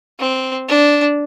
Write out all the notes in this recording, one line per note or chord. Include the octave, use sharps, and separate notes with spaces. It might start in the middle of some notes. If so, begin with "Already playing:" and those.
C4
D4